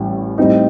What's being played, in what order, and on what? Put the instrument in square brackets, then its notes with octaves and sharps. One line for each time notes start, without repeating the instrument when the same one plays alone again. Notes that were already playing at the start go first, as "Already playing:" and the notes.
Already playing: [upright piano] A1 A2 G3
A2 G3 C4 D#4